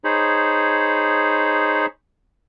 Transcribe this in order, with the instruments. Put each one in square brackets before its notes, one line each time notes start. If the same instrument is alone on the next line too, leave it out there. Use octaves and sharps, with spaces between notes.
[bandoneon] D#4 G#4 C5 C#5 B5